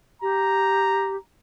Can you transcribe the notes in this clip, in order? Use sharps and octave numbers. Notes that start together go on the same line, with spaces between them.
G4 A#5